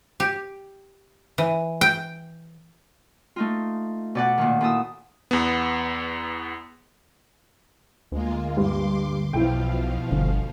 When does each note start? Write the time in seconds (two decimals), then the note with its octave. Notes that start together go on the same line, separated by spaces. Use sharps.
0.20 G4
1.38 E3
1.81 G5
3.36 A3 D#4 F4
4.15 B2 D5 F#5
4.38 A#2 D#3
4.61 A#2 E4 A4 D#6 E6
5.31 E2 B3
8.12 D2 G#3 A#3 F4
8.57 G2 C6 D6
9.33 B1 E2 B2 F3 E4 F4 G5
10.11 G1 D2